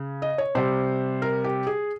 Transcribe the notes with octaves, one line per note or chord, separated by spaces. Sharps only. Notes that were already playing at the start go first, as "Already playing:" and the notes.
Already playing: C#3
D#5
C#5
C3 G3 C5
A#4
G4
G#4